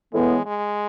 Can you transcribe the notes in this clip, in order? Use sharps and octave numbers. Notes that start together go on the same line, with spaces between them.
A2 E3 G#3 B3
G#3